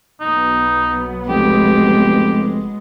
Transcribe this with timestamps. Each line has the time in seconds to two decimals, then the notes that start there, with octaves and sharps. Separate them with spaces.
0.21 B1 F#3 B3 D#4
1.29 F1 G#3 G4